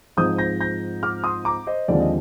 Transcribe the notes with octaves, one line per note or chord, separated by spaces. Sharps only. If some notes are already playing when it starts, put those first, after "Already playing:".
G#2 F3 C4 D#4 D#6 G6
G6 A#6
G6 A#6
D6 F6
C6 D#6
A#5 D6
C5 D#5
D#2 D3 F3 G#3 C4 D5
D#5